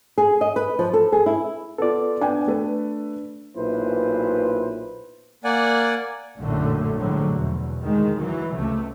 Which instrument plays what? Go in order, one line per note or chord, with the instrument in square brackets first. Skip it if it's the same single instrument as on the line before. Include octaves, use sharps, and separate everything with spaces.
[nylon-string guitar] G#4
D#5
B4
F3
A4
G#4
E4
[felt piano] B3 F4 [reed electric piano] A4 D5
[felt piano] B3 G5 G#5 [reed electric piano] D4
[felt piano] A3 A4 B4
[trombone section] B1 A#2 E4 B4 C5
[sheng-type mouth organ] A#3 D5 F#5 G#5
[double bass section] A#1 F#2 A2 D3 A3
A2 D3 F3 F#3 G#3 A3
E2 B2
D2 D#3 G#3
E3 F#3
C#2 C3 A3